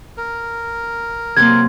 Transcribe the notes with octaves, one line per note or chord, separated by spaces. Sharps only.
A#4
C3 F#3 A#3 G#6